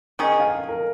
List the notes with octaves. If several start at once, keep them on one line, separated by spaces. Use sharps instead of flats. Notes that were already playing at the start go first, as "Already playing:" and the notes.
D#3 C#4 G#4 D#5
F5
A#4